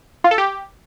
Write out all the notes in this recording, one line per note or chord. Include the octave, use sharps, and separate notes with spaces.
F4
A4
G4